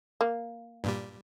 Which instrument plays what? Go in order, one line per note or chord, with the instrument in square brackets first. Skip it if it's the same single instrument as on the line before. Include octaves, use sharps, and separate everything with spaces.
[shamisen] A#3
[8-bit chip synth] G2 A#2 G3